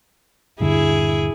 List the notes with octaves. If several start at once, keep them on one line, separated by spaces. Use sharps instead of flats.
D#1 G2 D3 E4 G#4